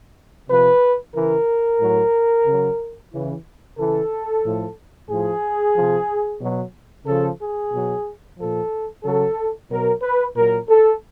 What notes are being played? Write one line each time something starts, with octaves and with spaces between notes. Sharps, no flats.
C3 F3 B4
C#3 E3 A#4
A2 F#3
C#3 F#3
C#3 E3
C#3 E3 A4
A2 F3
A2 F3 G#4
C3 F3
B2 F#3
C#3 F3 A4
G#4
B2 F#3
A#2 F3 A4
C#3 F#3 A4
B2 F#3 A#4
B4
A#2 F#3 A#4
A4